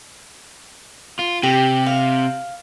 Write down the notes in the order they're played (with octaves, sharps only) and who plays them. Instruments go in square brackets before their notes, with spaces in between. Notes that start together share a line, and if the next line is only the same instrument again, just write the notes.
[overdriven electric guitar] F4
[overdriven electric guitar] C3 [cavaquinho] G4
[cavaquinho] F5